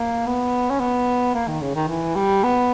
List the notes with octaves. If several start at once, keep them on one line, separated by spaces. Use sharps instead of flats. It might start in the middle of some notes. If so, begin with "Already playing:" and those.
Already playing: A#3
B3
C#4
B3
A#3
D#3
C#3
D#3
E3
G3
B3